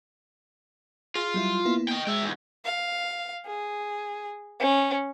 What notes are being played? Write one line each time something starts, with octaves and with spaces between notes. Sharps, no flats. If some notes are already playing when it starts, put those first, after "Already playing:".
F4 G#4
F#3 G3 E4
A#3 B3 E4
D#5 G5
G#3 E5 G5
E2 G#2
F5
G#4
C#4